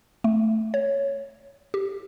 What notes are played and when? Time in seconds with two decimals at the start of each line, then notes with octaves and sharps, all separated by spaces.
0.24 A3
0.74 C#5
1.74 G4